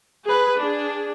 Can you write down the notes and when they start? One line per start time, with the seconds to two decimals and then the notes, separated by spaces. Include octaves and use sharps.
0.25 G#4 B4
0.60 D4 G#4